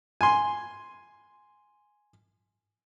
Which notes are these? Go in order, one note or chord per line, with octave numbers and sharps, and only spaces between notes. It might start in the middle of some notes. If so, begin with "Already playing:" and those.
G#5 C6